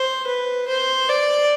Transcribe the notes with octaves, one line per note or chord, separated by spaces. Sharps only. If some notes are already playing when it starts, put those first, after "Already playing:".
Already playing: C5
B4
C5
D5